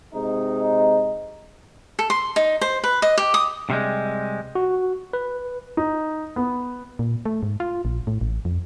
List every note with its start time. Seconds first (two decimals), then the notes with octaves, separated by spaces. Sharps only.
0.14 C3 G#3 D#4
1.99 A4
2.10 C6
2.36 D#4
2.61 C5
2.84 B4
3.02 D#5
3.18 G4
3.34 D#6
3.70 C3 G3 G#3
4.55 F#4
5.13 B4
5.77 D#4
6.36 B3
6.99 A#2
7.25 A3
7.43 G#2
7.60 F4
7.85 A#1
8.07 A2
8.21 A1
8.45 F2